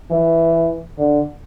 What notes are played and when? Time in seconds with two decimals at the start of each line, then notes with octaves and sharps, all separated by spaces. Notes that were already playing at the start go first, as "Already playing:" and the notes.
0.10 E3
0.98 D3